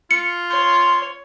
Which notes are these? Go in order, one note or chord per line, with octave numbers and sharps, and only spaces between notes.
F4 C#7
C#5 C6